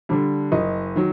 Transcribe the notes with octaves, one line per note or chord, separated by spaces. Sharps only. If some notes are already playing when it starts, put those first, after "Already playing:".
D3 G3 D4
F#1 D#5
D#3 F#3